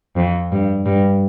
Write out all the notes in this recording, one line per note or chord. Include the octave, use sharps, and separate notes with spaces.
F2
G2
G2